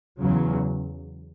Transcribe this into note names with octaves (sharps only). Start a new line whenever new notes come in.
E2 C#3 F#3